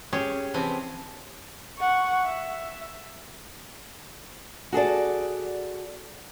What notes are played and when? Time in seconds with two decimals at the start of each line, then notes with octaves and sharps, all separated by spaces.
0.13 C#4 G4 G#4 C#5
0.54 C3 E3 F3 C4 G#5
1.77 F#5 C#6
2.24 E5
4.73 F#4 G#4 A4 D5